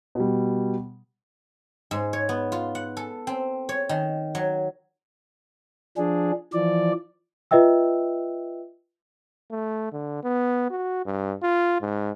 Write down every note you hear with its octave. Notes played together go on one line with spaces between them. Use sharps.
B2 G3
G#2
C#5
B3
F4
F#5
A4
C4
C#5
D#3
F#3
F3 D4 G#4
E3 F3 D5
F4 B4 D#5 E5 G5 E6
A3
D3
B3
F#4
G2
F4
G#2